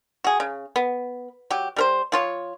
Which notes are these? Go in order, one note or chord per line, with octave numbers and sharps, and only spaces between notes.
F#4 G#4
C#3
B3
F#3 G4
G3 A#4 C5
F3 F4 C#5